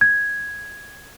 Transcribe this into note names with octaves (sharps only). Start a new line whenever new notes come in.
G#6